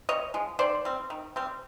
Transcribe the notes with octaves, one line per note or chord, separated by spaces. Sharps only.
C3 C#5 D#5
F3 G#3
D#3 C5 D5
G3 C4
D#3
G3 C4